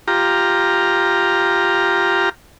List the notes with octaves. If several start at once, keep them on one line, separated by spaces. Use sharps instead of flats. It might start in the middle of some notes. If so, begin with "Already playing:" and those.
F4 G4 A#5